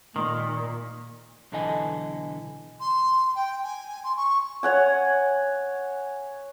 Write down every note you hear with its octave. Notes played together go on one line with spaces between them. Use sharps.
A#2 D#3
B1 D3 E3 A4 D#5 G#5
C6
G5
G#5
G#5
C6
C#6
C#5 F#5 G#5